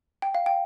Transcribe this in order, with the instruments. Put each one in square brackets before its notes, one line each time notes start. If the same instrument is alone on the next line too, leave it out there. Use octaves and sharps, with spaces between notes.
[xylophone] G5
F5
G5